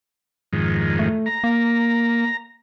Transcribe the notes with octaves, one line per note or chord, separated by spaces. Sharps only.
F2 G#2 D#3
A3
A#5
A#3